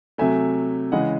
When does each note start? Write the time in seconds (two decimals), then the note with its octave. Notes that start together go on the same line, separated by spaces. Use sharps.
0.18 C3 F#3 A3 E5 G#5
0.92 C#3 E3 G#3 D#5 F#5